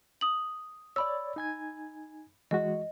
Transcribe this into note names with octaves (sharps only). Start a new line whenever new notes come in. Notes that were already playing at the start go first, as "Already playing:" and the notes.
D#6 F#7
C#5 D5 B5 E6
D#4 G#5 G#6
E3 G#3 F#4 D#5